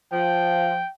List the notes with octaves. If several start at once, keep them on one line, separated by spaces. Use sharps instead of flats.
F3 G5